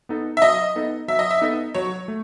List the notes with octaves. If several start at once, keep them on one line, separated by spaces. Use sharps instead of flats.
B3 D#4 A4 D#5
E5
F#3 D#5
B3 D#4 A4 D#5
F#3 E5
D#5
E5
B3 D#4 A4 D#5
F#3 C#5
A3